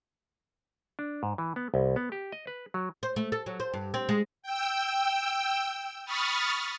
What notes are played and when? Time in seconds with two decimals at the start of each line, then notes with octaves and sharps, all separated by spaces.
0.99 D4
1.23 G#2
1.38 E3
1.56 B3
1.74 C2
1.96 B3
2.12 G4
2.32 D#5
2.47 B4
2.74 F#3
3.03 C5
3.16 A3
3.32 A4
3.46 F#3
3.60 C5
3.74 G2
3.94 C4
4.09 G#3
4.42 G5 E6
6.05 B5 C#6 D#6 F6 A6